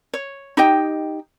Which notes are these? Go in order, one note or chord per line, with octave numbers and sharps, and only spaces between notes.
C#5
D#4 G4 D#5 G5